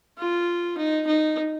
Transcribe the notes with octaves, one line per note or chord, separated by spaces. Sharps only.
F4
D#4
D#4